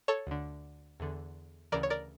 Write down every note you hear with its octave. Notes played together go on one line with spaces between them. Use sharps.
A4 C#5
D2 D3
E2 D3
D2 C#3 E3 A#4 D5
C#5
A#4 D5